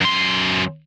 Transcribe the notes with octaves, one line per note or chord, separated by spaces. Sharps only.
F#2 C6